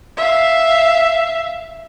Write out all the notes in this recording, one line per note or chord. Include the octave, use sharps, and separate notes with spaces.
E5 F5